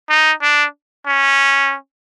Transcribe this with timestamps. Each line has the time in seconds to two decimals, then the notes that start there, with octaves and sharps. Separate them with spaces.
0.09 D#4
0.42 D4
1.07 C#4